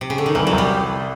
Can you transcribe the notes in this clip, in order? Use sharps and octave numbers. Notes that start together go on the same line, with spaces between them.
C3
C#3
D3
D#3
C2 E3
F#3
C2
G3